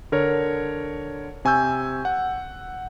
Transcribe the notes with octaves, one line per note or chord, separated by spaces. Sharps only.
D3 A#4 C#5
C3 G#5 C#6 E6 G6
F#5